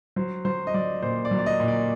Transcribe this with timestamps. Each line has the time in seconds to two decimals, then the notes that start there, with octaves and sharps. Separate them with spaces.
0.16 F#3 C5
0.45 F#3 C5
0.67 D#5
0.74 F#3 D5
1.02 A#2 C5
1.25 D5
1.31 F#3
1.39 D5
1.46 D#5
1.60 A#2
1.68 D5